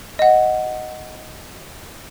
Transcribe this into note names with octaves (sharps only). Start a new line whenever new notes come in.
D#5 F#5